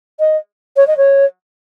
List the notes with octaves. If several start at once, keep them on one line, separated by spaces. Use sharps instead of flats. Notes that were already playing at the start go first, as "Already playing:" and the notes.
D#5
C#5
D#5
C#5